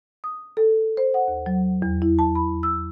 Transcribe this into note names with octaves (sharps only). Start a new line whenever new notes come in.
D#6
A4
C5
F#5
D#2
F#3
E2
E4
A5
B5
E6